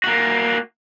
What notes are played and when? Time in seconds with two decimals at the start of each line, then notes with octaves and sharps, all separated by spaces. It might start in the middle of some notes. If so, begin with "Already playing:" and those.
0.04 A#3 F#4